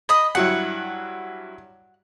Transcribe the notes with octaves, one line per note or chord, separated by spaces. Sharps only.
D#5 B5 D#6
G2 F#3 E4 F#5